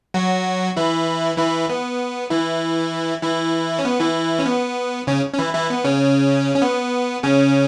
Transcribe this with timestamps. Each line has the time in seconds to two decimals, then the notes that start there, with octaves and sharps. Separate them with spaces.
0.14 F#3 F#4
0.77 E3 E4
1.38 E3 E4
1.70 B3
2.30 E3 E4
3.22 E3 E4
3.79 C#4
3.85 B3
4.00 E3 E4
4.39 C#4
4.46 B3
5.07 C#3 C#4
5.34 C#4
5.38 E3 E4
5.54 E3 E4
5.70 B3
5.84 C#3 C#4
6.55 C#4
6.62 B3
7.23 C#3 C#4